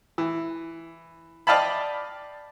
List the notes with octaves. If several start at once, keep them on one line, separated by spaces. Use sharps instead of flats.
E3
D5 D#5 F5 G5 A5 B5